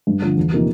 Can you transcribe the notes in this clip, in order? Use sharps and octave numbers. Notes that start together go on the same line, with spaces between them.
G2
D3 F3 A3
E2
C3 F3 A#3 D#4